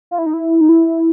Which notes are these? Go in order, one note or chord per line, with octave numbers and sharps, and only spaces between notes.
F4
E4
D#4
E4
D#4
E4